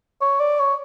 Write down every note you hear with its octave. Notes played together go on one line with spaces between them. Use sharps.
C#5
D5
C#5